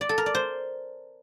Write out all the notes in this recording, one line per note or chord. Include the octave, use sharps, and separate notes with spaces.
D5
A4
A#4
D5
C5